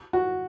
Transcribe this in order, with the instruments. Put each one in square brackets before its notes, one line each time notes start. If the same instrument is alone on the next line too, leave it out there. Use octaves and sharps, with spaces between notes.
[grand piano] F#4